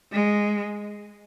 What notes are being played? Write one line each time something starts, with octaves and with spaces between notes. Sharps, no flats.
G#3